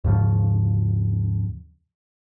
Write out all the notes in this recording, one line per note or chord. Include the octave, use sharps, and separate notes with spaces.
D#2 G#2 C#3 F3